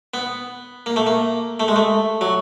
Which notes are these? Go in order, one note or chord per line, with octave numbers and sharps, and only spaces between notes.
B3
A#3
A3
A#3
A3
G#3
A3
F#3